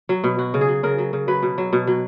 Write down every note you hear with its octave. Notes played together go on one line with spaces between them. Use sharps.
F#3
B2
F#3 F#4
C#3
G#4
F#3
C#3 A#4
F#3
C#3
F#3 B4
B2
F#3
B2
F#3